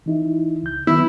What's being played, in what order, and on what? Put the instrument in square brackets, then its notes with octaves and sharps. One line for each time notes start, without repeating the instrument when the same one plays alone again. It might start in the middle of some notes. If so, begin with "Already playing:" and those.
[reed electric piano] E3 D#4 E4
C#2 G6
[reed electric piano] D#3 F#3 B3 [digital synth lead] E4